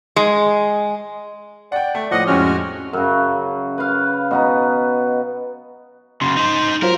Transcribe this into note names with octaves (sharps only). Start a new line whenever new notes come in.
G#3
D5 F#5 G5
A3
A2 F3 D#5 F#5 D6 D#6 A#6
F2 G#3 C#4 F#4 C#5 F6
F#2 C#3
B4 F5
B2 B3 D#4
F#2 C#3 C6
D#4 C5
F#3 F4 A#4 C5